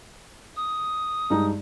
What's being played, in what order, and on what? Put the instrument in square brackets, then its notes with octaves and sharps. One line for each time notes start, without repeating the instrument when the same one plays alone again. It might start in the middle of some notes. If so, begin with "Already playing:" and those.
[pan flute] D#6
[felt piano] G2 G#3 D#4